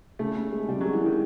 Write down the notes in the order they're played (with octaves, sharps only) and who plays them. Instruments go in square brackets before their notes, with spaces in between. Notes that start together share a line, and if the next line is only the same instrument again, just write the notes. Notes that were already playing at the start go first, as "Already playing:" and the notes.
[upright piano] C#3 [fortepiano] A3
[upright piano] D#2
G#3
[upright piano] C#3 [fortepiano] G3
[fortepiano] F#3 [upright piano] G#3
[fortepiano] E3
[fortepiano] D#3 [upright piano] G#3